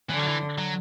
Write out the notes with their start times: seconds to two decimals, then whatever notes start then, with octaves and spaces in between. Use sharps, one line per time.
0.10 D3 E3
0.19 F#3
0.28 E3
0.58 F#3